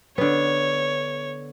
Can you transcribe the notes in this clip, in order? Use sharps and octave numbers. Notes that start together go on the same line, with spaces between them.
D3 B3 C#5